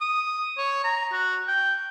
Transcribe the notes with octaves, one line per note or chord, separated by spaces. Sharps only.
D#6
C#5
A#5
F#4
G5